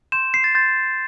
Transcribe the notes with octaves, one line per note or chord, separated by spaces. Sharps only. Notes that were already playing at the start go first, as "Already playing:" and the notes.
C6 G6 E7
C7
A6
C6 G6 A6